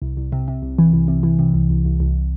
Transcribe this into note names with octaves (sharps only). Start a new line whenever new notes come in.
C2
C2
C3
C3
C2
E3
C2
C3
E3
C3
C2
C2
C2
C2